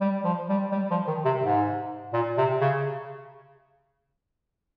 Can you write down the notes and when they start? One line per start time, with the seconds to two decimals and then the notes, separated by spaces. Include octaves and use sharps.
0.01 G3
0.24 F3
0.49 G3
0.72 G3
0.91 F3
1.07 D#3
1.25 C3
1.42 G#2
2.13 A#2
2.37 C3
2.61 C#3